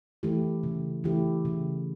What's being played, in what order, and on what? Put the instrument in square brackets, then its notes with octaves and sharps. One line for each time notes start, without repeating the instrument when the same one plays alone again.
[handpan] E3 A3 E4 G4
C#3
E3 A3 E4 G4
C#3